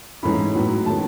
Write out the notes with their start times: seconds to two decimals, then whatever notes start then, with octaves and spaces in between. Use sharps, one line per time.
0.23 G#2 E3 A3 C#4 B5
0.55 A2 F#3 B3
0.86 D#3 G#3 C#4 A5